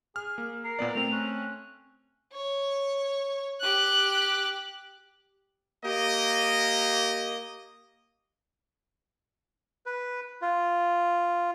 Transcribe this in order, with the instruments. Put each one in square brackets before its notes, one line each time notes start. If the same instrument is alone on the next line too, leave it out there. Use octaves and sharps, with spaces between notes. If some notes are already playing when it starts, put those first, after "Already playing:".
[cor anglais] G#4 [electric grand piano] F6
[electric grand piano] A#3
[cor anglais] A#4 [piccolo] C7
[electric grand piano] A#2 B3 D5
[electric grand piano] A3 C4 [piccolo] F7
[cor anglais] C#4 [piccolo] F#6
[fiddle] C#5
G4 F#6
[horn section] A#3 G4 D#5
[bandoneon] B4
F4